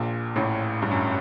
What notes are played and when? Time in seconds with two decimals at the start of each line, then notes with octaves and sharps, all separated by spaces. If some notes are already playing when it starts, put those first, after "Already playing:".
Already playing: A#1 A#2
0.36 A1 A2
0.82 G2
0.91 F#2